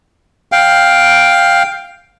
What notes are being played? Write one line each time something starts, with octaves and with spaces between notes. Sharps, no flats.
F5 G5